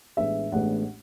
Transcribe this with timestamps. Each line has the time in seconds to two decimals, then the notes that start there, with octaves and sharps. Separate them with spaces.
0.17 A1 A2 G#3 B3 D4 E5
0.52 A1 A2 G#3 B3 D4 F#5